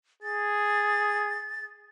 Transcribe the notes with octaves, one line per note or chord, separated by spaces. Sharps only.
G#4 A6